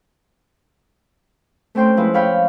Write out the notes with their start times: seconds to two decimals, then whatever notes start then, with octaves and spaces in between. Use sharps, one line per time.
1.75 A3 C4 C#4 G5 C6
1.97 F3 G#3 E4 B4
2.14 C#5 F5 G5 B5